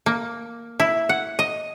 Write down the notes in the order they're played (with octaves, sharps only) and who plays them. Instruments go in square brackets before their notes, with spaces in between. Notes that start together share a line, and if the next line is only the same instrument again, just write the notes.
[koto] A#3
E4
F#5
D#5